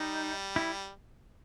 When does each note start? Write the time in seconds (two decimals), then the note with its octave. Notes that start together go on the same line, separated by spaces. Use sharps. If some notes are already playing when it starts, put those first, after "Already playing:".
Already playing: G3 D#4
0.56 E4